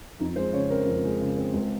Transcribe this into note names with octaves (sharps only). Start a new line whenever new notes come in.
F2 D#4
G#3 C5
C#3 C#5
C4 A#4
F2
G#3
C#3
C4
C#2